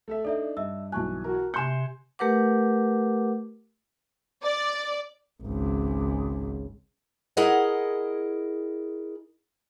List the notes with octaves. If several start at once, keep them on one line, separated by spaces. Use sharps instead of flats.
A3 A4 E5
D4 D#4 A4 D5 E5
G2 D#5 E5 E6
B1 E3 G#5 A5 C#6 F#6
F#4 A#4
C3 G#5 C6 F#6 G6 C#7 E7
A3 G4 A#4 B4 F#5 D6
D5
G#1 C#2
E4 G#4 A#4 D#5 F#5